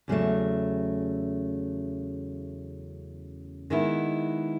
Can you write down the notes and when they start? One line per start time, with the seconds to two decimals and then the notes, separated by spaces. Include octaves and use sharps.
0.08 E2 C#3 F#3 A3
3.70 D#3 G#3 B3 E4